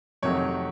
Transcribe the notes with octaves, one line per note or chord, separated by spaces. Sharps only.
F2 C3 D#3 F#3 A3 C#5